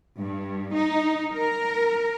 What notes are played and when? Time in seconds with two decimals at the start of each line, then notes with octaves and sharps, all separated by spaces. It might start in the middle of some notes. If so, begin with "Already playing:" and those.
0.19 G2
0.75 D#4
1.33 A#4